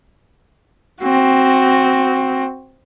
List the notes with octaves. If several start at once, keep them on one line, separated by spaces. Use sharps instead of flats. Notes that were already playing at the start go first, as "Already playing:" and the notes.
C4 F#4